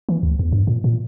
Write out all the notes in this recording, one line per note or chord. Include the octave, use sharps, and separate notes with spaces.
E3
D2
E2
G2
A#2
A#2